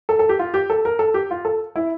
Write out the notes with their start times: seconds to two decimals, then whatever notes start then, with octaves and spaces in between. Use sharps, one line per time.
0.09 A4
0.19 A4
0.29 G4
0.39 F4
0.54 G4
0.70 A4
0.85 A#4
0.99 A4
1.14 G4
1.31 F4
1.45 A4
1.76 E4